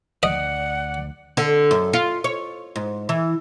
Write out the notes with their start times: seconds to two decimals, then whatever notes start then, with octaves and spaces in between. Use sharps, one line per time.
0.23 D2 D5 D#5 F#5
1.37 D3
1.71 F#2
1.93 F4
2.24 C#5
2.76 G#2
3.09 E3